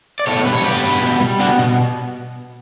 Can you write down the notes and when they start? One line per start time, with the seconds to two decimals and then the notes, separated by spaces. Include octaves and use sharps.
0.19 D5
0.27 B2 A4 C#5
0.45 G3 B4
0.55 C#5
0.64 B3 G4 B4
0.83 B2
1.01 B2
1.20 G3
1.40 B3 D4 F#4
1.59 B2